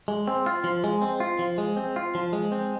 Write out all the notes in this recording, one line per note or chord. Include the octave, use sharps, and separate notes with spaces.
G#3
C4
F4
F3
G#3
C4
F4
F3
G#3
C4
F4
F3
G#3
C4